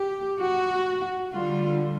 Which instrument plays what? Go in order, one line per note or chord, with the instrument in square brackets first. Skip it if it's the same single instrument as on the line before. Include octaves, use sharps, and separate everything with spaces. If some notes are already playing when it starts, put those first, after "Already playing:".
Already playing: [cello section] G4
F#4
D3 G3 F4